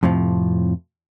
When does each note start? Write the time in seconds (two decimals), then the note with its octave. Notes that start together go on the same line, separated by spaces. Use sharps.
0.03 F2 A2 C3 F3